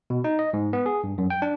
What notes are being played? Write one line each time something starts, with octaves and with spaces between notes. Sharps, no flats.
B2
D#4
D#5
G#2
B3
G#4
G2
F#2
G5
D4